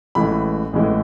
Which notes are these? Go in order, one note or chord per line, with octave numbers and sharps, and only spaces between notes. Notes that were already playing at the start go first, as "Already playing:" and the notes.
A1 A2 E3 G#3 B5
A1 A2 E3 G#3